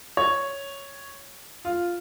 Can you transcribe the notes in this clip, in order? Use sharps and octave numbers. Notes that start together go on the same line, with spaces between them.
C#5
F4